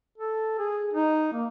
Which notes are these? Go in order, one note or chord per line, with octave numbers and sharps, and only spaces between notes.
A4
G#4
D#4
A#3